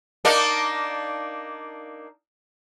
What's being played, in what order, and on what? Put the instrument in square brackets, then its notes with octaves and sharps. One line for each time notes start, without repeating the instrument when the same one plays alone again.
[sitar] A#3 D4 D#4